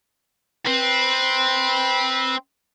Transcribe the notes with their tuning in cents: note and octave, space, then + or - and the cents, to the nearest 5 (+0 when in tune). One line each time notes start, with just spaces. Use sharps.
C4 +0 B4 -15